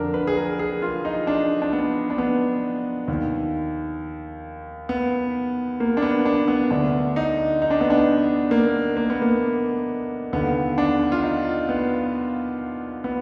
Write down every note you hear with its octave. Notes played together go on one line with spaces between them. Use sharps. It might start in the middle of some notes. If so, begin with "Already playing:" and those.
Already playing: F2 D3 D4 A#4
B4
G#4
A#4
G#4
F4
D#4
D4
D4
B3
D4
B3
D#2 D#3
B3
A#3
D4
B3
D4
B3
D2 D3 D4
D#4
D#4
D4
B3
D4
A#3
A#3
B3
A#3
D#2 D3 B3
D4
F4
D#4
B3
B3